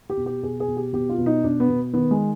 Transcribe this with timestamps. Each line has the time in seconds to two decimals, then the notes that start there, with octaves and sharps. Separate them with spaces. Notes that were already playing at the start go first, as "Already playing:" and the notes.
0.10 G4
0.17 B2
0.26 G4
0.43 B2 G#4
0.60 G#4
0.68 B2
0.77 G4
0.93 B2 G4
1.09 F4
1.18 B2
1.26 D#4
1.44 B2 D4
1.60 B3
1.69 B2
1.93 D#3 B3
2.11 G#3